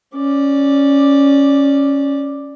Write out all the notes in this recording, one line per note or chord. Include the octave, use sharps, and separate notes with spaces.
C#4 D5